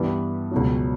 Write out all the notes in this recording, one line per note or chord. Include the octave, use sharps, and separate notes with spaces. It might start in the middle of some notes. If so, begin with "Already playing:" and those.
Already playing: G2 E3 G3 B3
C#2 B2 F#3